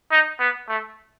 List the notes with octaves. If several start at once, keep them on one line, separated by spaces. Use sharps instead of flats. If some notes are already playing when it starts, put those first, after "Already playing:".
D#4
B3
A3